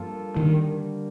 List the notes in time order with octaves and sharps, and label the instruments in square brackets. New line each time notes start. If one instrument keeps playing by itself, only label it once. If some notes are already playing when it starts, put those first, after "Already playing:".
Already playing: [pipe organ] G2 F3 A#3 F4 A4
[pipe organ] D3 G3 A#3 [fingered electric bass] D#3